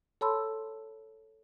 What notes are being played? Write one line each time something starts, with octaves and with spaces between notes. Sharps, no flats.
A4 C#5 A5 B5 C6 E6